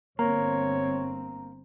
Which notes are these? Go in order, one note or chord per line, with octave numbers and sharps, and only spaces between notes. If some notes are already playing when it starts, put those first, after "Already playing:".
G1 A#3 C4 C#5 A#5